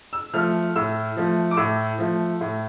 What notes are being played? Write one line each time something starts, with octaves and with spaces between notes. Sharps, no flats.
E6
F3 A3 F6
A2 E6
F3 A3
D6
A2 E6
F3 A3
A2